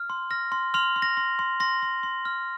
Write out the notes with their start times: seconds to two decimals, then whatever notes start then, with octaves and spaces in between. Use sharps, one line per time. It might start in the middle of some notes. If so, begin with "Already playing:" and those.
Already playing: F6
0.10 C6
0.30 F6 A#6
0.52 C6
0.74 C6 F6 F7
0.96 C6
1.02 A#6
1.17 C6
1.39 C6
1.60 C6 A#6
1.82 C6
2.03 C6
2.25 F6